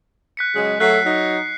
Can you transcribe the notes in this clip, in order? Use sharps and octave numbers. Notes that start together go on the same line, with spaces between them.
F#6 B6 C#7
C#3 F#3 G#3
F#3 A3 F#6 B6 C7
F#3 D#4